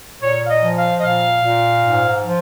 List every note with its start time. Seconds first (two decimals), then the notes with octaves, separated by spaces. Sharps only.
0.21 A#2 C#5
0.44 F5
0.49 D#5
0.62 F3
0.76 F5
0.98 D#5
1.03 A#2 F5
1.44 A#2
1.84 G#2
2.25 F3